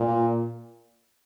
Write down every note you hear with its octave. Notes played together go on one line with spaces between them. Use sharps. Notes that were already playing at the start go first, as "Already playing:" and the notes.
Already playing: A#2